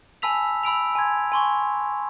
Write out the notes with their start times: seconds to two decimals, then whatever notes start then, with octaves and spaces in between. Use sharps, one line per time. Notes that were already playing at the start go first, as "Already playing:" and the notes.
0.22 G#5 A5 B5 E6 B6 F7
0.63 B5 E6 D7 F7
0.95 G#5 C6 G#6
1.32 G#5 C6 C#6